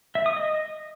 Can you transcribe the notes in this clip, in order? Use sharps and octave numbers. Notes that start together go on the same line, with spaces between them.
E5
D#6
D#5